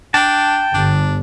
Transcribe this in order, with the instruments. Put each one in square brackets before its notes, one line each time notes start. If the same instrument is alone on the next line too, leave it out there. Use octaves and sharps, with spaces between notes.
[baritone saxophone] D4 [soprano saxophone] G5 [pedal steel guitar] A5
[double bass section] G1 [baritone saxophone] D4